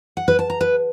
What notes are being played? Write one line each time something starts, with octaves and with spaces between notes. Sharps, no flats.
F#5
B4
A5
A#5
B4